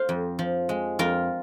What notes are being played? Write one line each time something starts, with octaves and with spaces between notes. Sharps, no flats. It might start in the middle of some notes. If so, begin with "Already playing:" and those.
Already playing: C5 F5
F2
F3
G#3
F2 F4 A#4